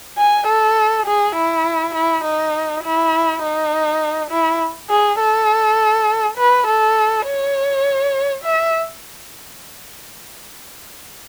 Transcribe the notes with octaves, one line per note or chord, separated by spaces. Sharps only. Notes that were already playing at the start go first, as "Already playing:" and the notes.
G#5
A4
G#4
E4
E4
D#4
E4
D#4
E4
G#4
A4
B4
A4
C#5
E5